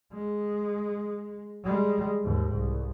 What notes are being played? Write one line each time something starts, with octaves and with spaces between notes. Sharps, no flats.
G#3
G3 G#3
D#2 G#2
C2